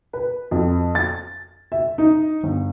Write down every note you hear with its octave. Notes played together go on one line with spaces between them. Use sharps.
B4
F2
A6
E5
D#4
G1